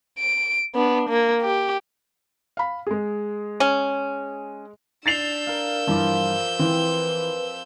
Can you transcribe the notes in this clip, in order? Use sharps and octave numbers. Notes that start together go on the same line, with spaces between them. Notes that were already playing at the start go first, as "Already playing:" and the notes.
D7
B3 D4
A#3
G4
F5 B5
G#3 G#4
C#4
D4 E6 G6 A6 C7 F7
A#4 F5
G2 E3 F3 D5
E3 C4 B4